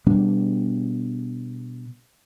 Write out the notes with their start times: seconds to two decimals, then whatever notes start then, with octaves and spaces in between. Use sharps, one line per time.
0.06 B2 G3 B3 D4